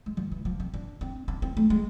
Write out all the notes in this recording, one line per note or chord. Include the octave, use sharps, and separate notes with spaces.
G#3
F3
E3
F3
C4
D4
C4
D4
C4
A3
G#3